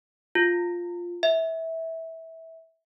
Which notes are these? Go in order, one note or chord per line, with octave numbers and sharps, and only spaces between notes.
F4
E5